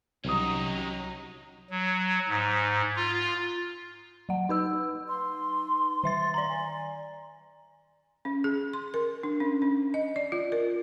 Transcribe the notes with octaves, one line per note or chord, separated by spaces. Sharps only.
C2 F#3 C#4 D#4 G4 D#6
F#3
G#2
F4
F#3 F#5
D#4 B4 E6
C6
D#3 E5 A6
D5 A#5
G#5
C#4
G#4
C6
A#4
D4
C#4
C#4
D#5
D5
F4
A#4